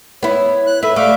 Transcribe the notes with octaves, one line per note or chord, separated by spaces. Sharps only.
B3 E4 C#5
F#6
A4 B4 E5
A3 D5 E5 F5 D6